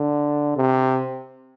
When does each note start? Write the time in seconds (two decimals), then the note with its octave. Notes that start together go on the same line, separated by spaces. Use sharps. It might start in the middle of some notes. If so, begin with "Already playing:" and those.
Already playing: D3
0.56 C3